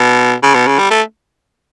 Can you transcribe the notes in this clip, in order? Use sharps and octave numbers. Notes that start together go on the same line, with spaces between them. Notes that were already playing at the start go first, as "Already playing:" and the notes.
Already playing: B2
C#3
B2
C#3
G3
A3